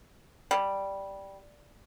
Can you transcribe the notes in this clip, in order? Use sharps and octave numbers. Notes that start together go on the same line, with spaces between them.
G3